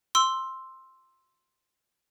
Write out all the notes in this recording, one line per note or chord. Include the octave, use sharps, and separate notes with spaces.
C6 E6